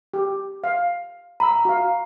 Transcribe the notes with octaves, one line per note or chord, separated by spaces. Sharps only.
G4
F5
A#5 B5 E6
F#4 F5